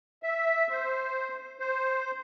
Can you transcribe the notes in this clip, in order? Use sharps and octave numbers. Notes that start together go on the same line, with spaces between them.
E5
C5
C5